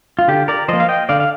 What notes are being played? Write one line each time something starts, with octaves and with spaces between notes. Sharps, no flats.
F4
D3 G4
A#4 D5
F3 A#3 C5 D#5
F5
D#5 G5
D3 D5 F5
F5